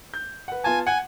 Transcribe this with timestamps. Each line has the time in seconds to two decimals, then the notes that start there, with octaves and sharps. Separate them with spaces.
0.14 G6
0.48 B4 F#5
0.64 B3 F4 G#5 A5
0.87 F#5 G#5